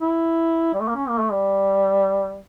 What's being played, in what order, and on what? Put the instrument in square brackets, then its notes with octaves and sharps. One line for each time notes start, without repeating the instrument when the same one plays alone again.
[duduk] E4
G3
A3
A#3
C#4
A#3
A3
G3